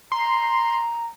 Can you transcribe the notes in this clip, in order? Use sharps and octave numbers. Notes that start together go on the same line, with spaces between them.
A#5 C6